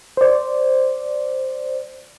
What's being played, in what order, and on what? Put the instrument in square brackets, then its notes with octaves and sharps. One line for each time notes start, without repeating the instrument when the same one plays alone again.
[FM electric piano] C5 D5